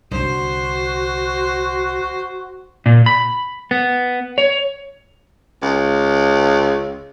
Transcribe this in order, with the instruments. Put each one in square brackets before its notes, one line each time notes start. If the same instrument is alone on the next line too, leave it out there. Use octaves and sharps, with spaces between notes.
[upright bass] C2 D3 [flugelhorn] F#4 [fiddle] C5
[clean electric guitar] A#2
B5
B3
C#5
[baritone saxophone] C#2